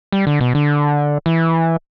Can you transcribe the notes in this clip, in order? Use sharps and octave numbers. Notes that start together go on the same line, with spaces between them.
G3
D3
B2
D3
E3